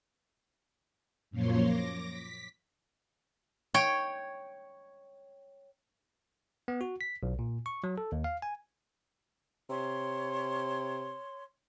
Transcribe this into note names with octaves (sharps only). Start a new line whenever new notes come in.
F#2 A#2 F3 A#3 C#5 C6
D6 A#6
B6
C#5 G5
B3
F#4
B6
B1
A#2
C#6
F#3
A4
D#2
F5
G#5
C3 C#5 C6